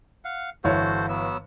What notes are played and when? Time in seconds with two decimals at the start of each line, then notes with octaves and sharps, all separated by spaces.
0.25 F5 F#5
0.64 G1 E3 F#4 A4 C5 C#5
1.09 F#3 B3 E6